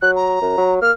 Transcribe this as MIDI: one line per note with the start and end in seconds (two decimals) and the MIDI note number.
0.02 0.38 54
0.02 0.11 90
0.16 0.75 82
0.41 0.53 42
0.58 0.77 54
0.82 0.92 58
0.82 0.91 89